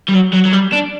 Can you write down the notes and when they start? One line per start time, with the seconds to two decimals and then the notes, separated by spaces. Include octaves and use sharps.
0.09 G3
0.14 F#3
0.33 F#3
0.46 F#3
0.53 G3
0.73 D4